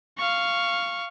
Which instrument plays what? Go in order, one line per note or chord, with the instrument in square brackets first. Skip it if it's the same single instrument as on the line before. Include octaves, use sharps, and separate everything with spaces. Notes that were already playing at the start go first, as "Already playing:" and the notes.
[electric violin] F5 C#6